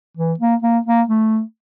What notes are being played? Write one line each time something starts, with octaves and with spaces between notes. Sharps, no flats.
E3
A#3
A#3
A#3
A3